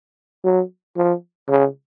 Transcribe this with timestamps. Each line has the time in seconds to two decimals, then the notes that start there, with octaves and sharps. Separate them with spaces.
0.44 F#3
0.97 F3
1.48 C#3